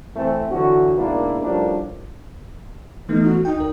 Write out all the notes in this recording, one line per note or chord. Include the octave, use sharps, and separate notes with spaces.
E3 A3 C4
D3 E3 F#3 F#4
G#2 B2 A#3 D4 E4
A2 F3 G3 C#4 D4 A#4
E3 A3 B3 D#4
F#4
D#4 G5
C#2 A#4